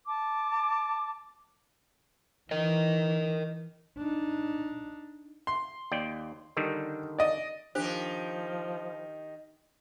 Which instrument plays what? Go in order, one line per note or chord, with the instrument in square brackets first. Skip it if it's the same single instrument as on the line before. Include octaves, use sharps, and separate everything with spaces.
[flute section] A5 D6
[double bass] E3 [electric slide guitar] A#4 D#5
[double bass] D4 D#4
[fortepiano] C6
[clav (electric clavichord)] D#2 D5 G5
D3 D#3 G3
[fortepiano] D5 D#5
[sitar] D#3 G4 [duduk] F3 [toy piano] D4 C5